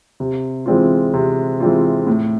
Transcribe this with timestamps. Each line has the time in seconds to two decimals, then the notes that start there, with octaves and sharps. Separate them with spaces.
0.20 C3
0.66 E3 G#3 C4 F4
1.14 C3
1.60 E3 G#3 C4 F4
2.07 A2